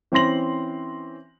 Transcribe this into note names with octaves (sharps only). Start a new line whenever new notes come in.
E3 C4 C#4 C6 A#6 F#7